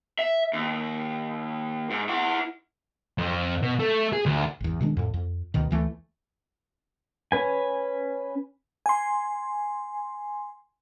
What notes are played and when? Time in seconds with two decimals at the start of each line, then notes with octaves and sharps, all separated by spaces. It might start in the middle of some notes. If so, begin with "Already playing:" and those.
0.19 E5
0.53 D#2
1.90 G#2
2.09 E4 F#5
3.18 F2
3.62 B2
3.79 A3
4.13 G#4
4.26 D2
4.60 G#1 E2
4.81 B2 D#3 G#3 D4
4.97 F2 A2
5.14 F2
5.54 D2 B2 D#3
5.71 D2 E3 A3
7.32 C#4 B4 G#5
8.86 G#5 C6